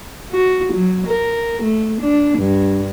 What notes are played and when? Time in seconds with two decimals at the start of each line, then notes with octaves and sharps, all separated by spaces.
0.31 F#4
0.73 F#3
1.06 A#4
1.62 A3
2.01 D4
2.38 G2